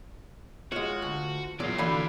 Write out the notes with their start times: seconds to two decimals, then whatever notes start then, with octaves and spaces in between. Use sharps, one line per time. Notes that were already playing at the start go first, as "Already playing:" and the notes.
0.72 G#3 F4 F#4 C#5
1.02 D2
1.60 E2 A#2 F#3 D5 F5
1.78 D3 E3 A#3 F#4 G5 B5